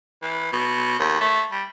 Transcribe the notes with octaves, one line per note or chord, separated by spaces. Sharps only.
E3
B2
D#2
A3
G3